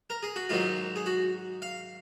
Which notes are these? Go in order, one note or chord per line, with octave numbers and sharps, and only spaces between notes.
A#4
G#4
F#4
G#2 D#3 F#3 F4
G#4
F#4
F5